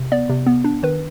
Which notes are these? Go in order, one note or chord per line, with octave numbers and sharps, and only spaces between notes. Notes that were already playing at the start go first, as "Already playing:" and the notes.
Already playing: C3
B3 D5
C3
B3
D4
D#3 B4